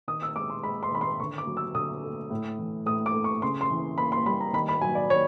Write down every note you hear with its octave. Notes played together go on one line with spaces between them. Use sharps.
D#3 D#6
E6
G#3 D6
C6
G#3 B5
C6
D#3 B5
C6
D3 C#6
D6
F#3
E6
D3 D#6
A3
A2
E3
A2 D#6
D6
A3
C#6
C#3 C6
C6
E3
A#3 B5
C6
G3 B5
A#5
D#3 B5
B5
F#3 G#5
D5
D#3 C#5